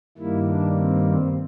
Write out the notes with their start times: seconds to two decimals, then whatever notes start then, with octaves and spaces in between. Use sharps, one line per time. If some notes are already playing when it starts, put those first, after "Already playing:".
0.17 G2 D#3 G3 A#3 E4
0.47 D4
0.77 C4
1.07 C4